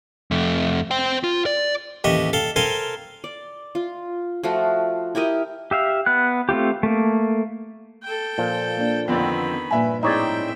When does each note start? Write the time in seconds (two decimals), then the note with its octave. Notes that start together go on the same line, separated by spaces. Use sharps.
0.31 F2 A3
0.91 C5 G5
1.24 F4
1.46 D5
2.04 A1 D#2 G4 D#5 E5 C#6
2.33 A4 F5 G5
2.56 A4 A#4 C5 F5 G5 G#5
3.24 D5
3.75 F4
4.43 F3 A3 F4 F#4
5.15 E4 G4 A#4 D#5
5.71 G4 E5 F5
6.06 B3 F#6
6.49 A3 C4 F4 G4
6.83 A3 A#3
8.04 A4 G5
8.38 A#2 F3
8.77 A#3 D4
9.08 F2 D3 D#3 B3 C4 B5
9.71 G2 A#2 F3 B4 E5 G#5 B5
10.03 A2 C4 D#4 G#4 C#5 D5 E5 G5